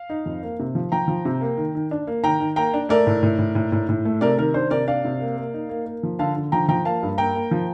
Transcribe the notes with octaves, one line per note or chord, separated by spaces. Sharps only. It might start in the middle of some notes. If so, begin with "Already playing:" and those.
Already playing: F5
D#4
F2
A#3
C3
F3
F3 G5 A#5
F3
C3
A#3
D#3
D#3
D4
A#3
D#3 G5 A#5
D#3
A#3 G5 A#5
D4
A3 A#4 D5
A2
A2
A2
A2
A2
A2
A3
C3 A#4 D5
D#3 A#4
D4 C5
C3 A#4 D5
D4 D5 F5
C3
A#3
A#3
D#4
A#3
A#3
F3
D3 F5 A5
D3
F3 G5 A#5
F3 G5 A#5
A#3 F5 A5
G2
A#3 G5 A#5
A#3
F3